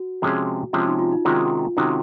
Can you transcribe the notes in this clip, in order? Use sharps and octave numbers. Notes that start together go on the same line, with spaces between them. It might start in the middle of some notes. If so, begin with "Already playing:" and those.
Already playing: F#4
C3 F3 G#3 C#4 G#4
C3 F3 G#3 C#4 F4 G#4
D#4
F4
D#4
C3 D#3 G#3 C#4 F4 F#4
C3 D#3 G#3 C#4 D#4 F#4